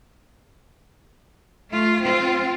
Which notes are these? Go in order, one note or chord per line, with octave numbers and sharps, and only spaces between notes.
A3 F4
C4 F4